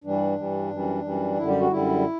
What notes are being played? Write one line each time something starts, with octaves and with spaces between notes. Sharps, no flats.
G2 E3 G3 D4
G2 E3 G3
F#2 E3 G3
F#2 E3 G3
F#2 D3 G3 E4
G4
F#4
F#2 D3 G3 E4